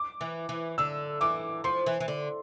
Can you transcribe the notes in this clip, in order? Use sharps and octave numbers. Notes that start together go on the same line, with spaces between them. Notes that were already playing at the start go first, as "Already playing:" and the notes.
Already playing: D6
E3
E3
D3 E6
E3 D6
F3 C6
E3
E3
D3